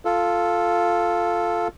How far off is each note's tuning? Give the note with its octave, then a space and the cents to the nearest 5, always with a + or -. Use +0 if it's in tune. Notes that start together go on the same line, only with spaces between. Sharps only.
F4 +0 A4 +0